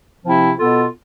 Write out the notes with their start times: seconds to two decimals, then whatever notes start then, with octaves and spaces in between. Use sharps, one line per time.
0.25 C3 F3 C4 E4
0.59 B2 B3 F4 A4